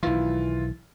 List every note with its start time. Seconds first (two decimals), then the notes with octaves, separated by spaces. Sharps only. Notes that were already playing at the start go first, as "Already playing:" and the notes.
0.03 B1 D#3 E3 E4 F4